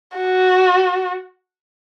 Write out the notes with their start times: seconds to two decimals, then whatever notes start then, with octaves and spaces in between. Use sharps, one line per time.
0.17 F#4